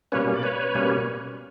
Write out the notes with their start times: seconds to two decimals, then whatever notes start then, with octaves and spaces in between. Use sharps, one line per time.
0.12 B2 G3 A#3 C#4 B4 C#5
0.34 D5
0.43 B4 C#5
0.74 B2 G3 A#3 C#4